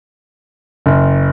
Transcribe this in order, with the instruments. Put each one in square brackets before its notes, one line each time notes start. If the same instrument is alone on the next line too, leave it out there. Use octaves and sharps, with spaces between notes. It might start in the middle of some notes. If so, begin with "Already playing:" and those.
[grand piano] F#1